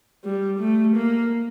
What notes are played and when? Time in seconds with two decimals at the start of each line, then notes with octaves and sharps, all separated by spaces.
0.25 G3
0.60 A3
0.96 A#3